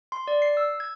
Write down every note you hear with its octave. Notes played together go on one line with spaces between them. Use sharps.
C6
D5
C7
E6
G#6